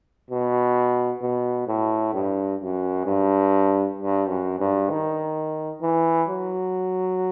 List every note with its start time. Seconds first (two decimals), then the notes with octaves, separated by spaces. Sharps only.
0.30 B2
1.21 B2
1.67 A2
2.14 G2
2.60 F#2
3.06 G2
3.98 G2
4.28 F#2
4.60 G2
4.90 D#3
5.82 E3
6.28 F#3